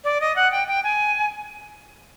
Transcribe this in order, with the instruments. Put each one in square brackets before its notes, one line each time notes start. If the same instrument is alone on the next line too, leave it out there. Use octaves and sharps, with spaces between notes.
[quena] D5
D#5
F#5
G5
G5
G#5